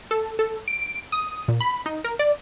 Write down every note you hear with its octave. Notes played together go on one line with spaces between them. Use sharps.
A4
A4
D7
D#6
A#2
B5
D#4
A#4
D5